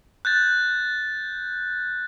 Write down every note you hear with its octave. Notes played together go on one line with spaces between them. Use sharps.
F#6 G6 A6